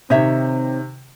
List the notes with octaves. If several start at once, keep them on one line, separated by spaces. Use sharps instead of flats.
C3 D#3 C4 D#4 C#5 E5